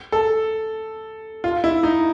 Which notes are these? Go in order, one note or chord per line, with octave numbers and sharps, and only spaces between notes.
A4
F4
E4
D#4